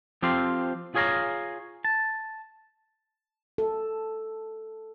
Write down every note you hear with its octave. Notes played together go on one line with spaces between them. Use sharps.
F3 C4 G4 A4 C5 F5
F4 G#4 C#5 F5 A#5
A5
A4